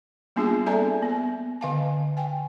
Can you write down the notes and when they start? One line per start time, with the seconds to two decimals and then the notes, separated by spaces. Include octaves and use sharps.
0.36 G3 A#3 B3 D4 F4 G#4
0.66 C4 A4 D5 E5 G#5 A#5
1.02 A#3 B3
1.61 D3 D#5 F5 G#5 A5
2.17 G5 G#5